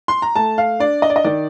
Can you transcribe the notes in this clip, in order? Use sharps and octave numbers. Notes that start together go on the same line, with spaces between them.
C6
A#5
A3 A5
F5
D4 D5
D#5
D5
D#5
D#3 D5